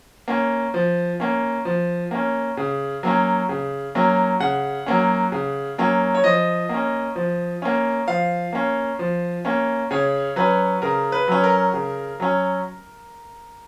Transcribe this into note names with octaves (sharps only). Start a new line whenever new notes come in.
A#3 C#4
F3
A#3 C#4
F3
A#3 C#4
C#3
F#3 A#3 C#4
C#3
F#3 A#3 C#4
C#3 F#5
F#3 A#3 C#4
C#3
F#3 A#3 C#4
C#5
F3 D#5
A#3 C#4
F3
A#3 C#4
F3 F5
A#3 C#4
F3
A#3 C#4
C#3 C#5
F#3 C#4 B4
C#3 A#4
B4
F#3 C#4
A#4
C#3
F#3 C#4